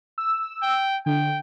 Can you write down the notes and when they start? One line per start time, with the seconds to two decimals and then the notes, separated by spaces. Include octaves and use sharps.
0.18 E6
0.63 G5
1.06 D3 G5